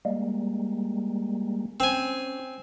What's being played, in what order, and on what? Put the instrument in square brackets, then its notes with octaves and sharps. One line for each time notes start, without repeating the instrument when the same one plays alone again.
[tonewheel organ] G3 G#3 A#3
[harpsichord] C4 G#5 [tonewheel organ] C#4